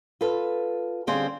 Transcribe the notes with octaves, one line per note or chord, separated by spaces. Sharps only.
F4 A4 B4
D3 G3 C4 C#4 G#4 F5